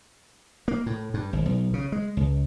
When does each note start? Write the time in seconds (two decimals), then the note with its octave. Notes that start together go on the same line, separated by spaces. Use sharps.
0.68 A#3
0.86 A2
1.14 G2
1.33 G#1
1.46 B1
1.73 C#3
1.92 G#3
2.17 C#2